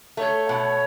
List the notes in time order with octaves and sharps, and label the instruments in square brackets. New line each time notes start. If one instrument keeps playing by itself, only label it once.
[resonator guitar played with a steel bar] A3 [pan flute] C#5
[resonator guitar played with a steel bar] B2